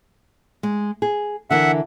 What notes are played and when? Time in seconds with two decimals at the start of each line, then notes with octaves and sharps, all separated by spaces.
0.63 G#3
1.02 G#4
1.50 D3 E3 A#4 E5 F#5